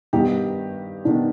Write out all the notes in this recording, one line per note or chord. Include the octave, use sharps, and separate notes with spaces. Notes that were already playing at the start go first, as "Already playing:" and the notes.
G2 D#3 B3 D4 D#4 G4
D#3 B3 D4